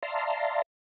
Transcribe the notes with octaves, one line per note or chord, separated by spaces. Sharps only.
D5 E5 F5 A5 A#5 C6